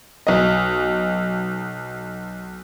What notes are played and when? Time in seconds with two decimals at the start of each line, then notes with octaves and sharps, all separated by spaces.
0.27 B1 D#5